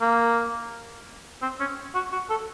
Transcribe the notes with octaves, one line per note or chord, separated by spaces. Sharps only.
A#3
C4
C#4
F#4
F#4
A4